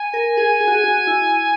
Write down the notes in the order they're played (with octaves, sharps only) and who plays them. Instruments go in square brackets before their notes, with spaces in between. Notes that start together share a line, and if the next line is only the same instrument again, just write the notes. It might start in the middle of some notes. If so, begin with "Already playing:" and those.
Already playing: [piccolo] G#5
[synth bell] A#4
G#4
G#4
F#4
G#4
F#4
E4